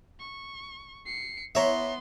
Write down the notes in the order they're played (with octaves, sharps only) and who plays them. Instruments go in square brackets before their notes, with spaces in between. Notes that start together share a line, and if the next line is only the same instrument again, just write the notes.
[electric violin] C#6
C7 C#7
[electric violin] B3 C6 [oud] E4 C#5 [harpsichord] E5 A#5